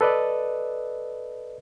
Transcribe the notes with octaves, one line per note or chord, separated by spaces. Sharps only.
A4 B4 D5 D#5